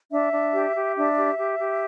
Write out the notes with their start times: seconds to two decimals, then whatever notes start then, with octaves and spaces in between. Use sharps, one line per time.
0.11 D4 E5
0.32 D4
0.53 G4
0.75 G4
0.96 D4 E5
1.17 G4
1.38 G4
1.59 G4